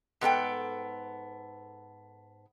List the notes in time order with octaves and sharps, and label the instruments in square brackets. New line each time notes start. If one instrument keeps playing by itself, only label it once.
[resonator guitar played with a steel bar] G#2 B3 A4 G5